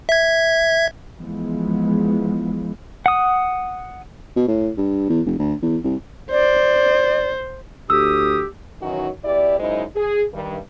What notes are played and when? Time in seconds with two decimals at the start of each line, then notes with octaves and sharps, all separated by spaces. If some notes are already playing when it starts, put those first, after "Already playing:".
0.09 E5 G#6
1.18 E3 F3 G#3 B3
3.06 F#5 D#6
4.36 B2
4.48 A2
4.77 G2
5.09 E2
5.26 F1
5.38 D2
5.62 E2
5.84 C2
6.31 C5 D5
7.90 D2 G4 D#6 E6
8.81 D#3 E3 F#3 C#4 D#4 F#4
9.24 B2 E4 G4 D5
9.59 F#2 G#3 D#4 E4 C5 D#5
9.96 G#4
10.33 G2 D#3